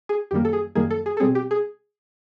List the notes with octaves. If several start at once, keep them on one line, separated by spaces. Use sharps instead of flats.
G#4
F#2 D#3 G3 A#3 G4
A4
G#4
F#2 D#3 G3 A#3 G#4
A4
G#4
A4
B2 G3 C4 G#4
G4
G#4